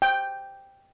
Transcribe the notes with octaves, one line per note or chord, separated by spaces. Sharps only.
G5